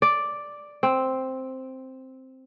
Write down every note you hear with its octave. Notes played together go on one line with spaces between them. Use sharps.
D5
C4